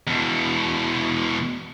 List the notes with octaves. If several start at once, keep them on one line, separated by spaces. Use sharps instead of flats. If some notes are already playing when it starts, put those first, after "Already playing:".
E2 B2